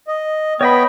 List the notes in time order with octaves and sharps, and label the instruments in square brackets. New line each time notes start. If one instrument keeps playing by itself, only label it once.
[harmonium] D#5
[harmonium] B3 G5 [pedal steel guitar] C#5 D#5 B5